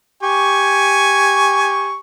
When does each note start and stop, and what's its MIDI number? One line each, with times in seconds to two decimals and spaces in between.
0.23 1.98 67
0.23 1.98 80
0.23 1.98 85